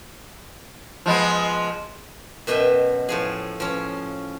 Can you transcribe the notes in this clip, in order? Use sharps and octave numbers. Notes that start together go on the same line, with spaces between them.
F3 G#3 B3
F#2 B2 D#5 E5 G5
A2 F3 G#4
F3 C#4